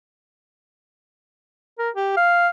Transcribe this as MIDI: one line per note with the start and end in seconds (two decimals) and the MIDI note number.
1.79 1.90 70
1.95 2.12 67
2.16 2.48 77